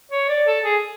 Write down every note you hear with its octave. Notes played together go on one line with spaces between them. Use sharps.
C#5
D5
A4
G#4